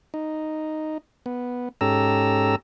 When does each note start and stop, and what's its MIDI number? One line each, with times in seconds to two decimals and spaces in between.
0.14 0.98 63
1.26 1.69 59
1.81 2.56 44
1.81 2.56 61
1.81 2.56 67
1.81 2.56 69
1.81 2.56 82
1.81 2.56 88